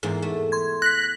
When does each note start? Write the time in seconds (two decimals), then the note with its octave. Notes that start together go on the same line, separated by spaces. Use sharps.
0.03 E2 G#2 A#3
0.22 A3
0.52 C6 G#6
0.82 F#6 A#6 B6